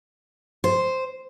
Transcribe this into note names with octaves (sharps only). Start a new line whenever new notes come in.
C5